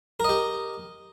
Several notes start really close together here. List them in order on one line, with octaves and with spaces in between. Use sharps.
A#4 D#5 G4